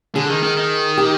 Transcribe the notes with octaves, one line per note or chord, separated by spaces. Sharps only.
D3 G#4
D#3
D#3
D#3
G4